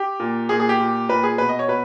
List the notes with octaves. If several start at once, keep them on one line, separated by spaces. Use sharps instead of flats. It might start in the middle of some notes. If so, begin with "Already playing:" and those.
Already playing: G4
A#2
A#2 G#4
G#4
G4
A#2
A#2 B4
G#4
B2 B4
D#5
C#5
B2 B4